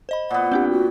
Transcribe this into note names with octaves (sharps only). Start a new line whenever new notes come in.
C5 D#5 B5
A#2 B3 F#5
C4 D4 G4 G5
F#4